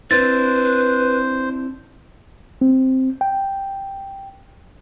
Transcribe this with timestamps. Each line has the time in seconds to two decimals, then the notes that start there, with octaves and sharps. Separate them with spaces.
0.11 C4 D4 E4 B4 C5 A6
2.61 C4
3.21 G5